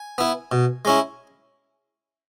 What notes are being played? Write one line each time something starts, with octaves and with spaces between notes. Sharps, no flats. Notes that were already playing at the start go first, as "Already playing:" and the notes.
Already playing: G#5
B3 E4
B2
G#3 C#4 E4